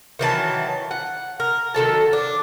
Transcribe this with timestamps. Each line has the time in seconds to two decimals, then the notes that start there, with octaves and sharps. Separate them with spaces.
0.19 D#3 E3 F#3 A5
0.91 F#5
1.40 A#4
1.74 D#3 F#3 A4 A5
2.13 D4